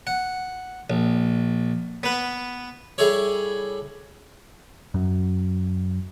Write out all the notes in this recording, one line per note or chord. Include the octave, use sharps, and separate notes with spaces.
F#5
A#1
B3 B4
G3 E4 G#4 A4 C#5
F#2